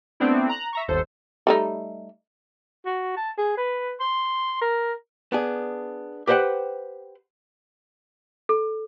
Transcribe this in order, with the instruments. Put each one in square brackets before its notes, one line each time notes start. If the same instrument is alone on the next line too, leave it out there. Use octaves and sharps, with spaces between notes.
[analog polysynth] A3 B3 C4 D4 E4
A#5 F#6
E5 A#5 C#6
G1 D#2 A4 C5
[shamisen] G3 A3 D#4
[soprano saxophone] F#4
A5
G#4
B4
C6
A#4
[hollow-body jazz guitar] B3 D4 G#4
G4 B4 C5 D#5 F#5 G5
[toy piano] A4